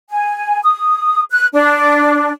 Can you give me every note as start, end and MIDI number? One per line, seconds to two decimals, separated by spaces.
0.10 0.60 80
0.63 1.22 87
1.31 1.46 90
1.53 2.31 62